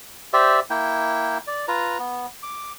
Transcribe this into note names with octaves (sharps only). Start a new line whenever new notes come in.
G4 C5 D5 E5
A#3 E4 G5
D5
F4 B4 A#5
B3
D6